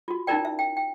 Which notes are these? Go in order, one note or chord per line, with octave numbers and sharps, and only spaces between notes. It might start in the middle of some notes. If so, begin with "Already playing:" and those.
F4 F#4
C#4 D#4 E4 A#4 D5 G5
E5
G5
G5